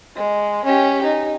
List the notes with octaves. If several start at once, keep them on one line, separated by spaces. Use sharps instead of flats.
G#3
C#4 G4
D#4